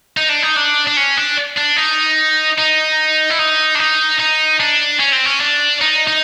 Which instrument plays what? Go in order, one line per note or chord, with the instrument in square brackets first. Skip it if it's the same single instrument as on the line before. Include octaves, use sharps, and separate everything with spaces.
[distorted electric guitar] D#4
D4
D#4
D4
D4
C#4
D4
D4
D#4
D#4
E4
D#4
D4
D#4
D#4
D4
C#4
C4
C#4
D4
D#4
D#4